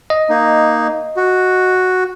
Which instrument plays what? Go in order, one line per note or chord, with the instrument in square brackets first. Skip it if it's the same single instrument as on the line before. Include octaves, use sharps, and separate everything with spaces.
[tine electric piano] D#5
[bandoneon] A#3 D#4
F#4